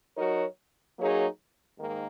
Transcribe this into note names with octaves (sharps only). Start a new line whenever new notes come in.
F#3 D#4 F#4 A#4 C#5
F#3 A#3 D#4 G#4 C#5
G#2 D#3 A#3